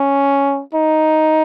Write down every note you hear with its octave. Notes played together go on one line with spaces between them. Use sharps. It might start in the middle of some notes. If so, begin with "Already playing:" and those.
Already playing: C#4
D#4